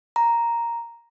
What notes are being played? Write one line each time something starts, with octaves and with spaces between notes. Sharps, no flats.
A#5